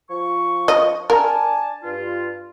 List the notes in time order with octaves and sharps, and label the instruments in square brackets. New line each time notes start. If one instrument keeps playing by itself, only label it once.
[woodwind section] F3 C#6
[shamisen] D#5
[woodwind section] D4 G#5 A5 [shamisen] A#4
[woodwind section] G2 F4